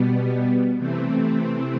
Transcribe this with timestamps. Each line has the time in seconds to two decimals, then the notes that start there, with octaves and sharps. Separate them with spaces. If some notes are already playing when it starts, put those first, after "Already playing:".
Already playing: B2 G3 B3
0.78 C3 E3 A3 C4